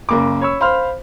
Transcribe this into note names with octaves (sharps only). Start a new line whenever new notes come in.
F#1 A#3 B5 D6
C#5 B5 C#6 E6
C5 F5 B5 C6 F6